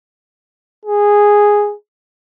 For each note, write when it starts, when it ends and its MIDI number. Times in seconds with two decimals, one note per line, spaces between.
0.85 1.74 68